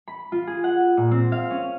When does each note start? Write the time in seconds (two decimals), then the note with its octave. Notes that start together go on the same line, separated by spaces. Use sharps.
0.07 B5
0.32 F4
0.47 G#4
0.64 F#5
0.97 A#2
1.11 C4
1.32 F5
1.50 C#4